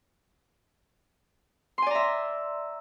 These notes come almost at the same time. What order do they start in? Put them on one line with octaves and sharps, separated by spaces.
C6 G#5 D5 A#5 E5